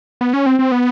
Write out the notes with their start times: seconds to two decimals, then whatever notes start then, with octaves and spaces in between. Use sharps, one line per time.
0.21 B3
0.34 C#4
0.46 C4
0.59 C4
0.72 B3